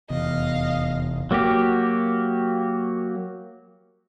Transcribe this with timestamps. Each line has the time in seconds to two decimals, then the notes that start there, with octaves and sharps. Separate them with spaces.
0.10 F1 E2 D#5 F5
1.31 F#3 A#3 F#4 G4